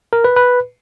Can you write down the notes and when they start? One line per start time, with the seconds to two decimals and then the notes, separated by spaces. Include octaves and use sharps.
0.13 A#4
0.24 B4
0.36 B4